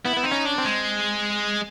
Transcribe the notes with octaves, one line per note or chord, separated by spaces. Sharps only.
B3 E4
B3
C4 D#4
C#4
D4
C4
G#3